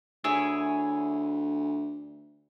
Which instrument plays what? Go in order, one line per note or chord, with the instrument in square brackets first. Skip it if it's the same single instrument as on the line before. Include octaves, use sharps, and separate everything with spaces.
[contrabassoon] D2 [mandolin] E4 G#4 C#5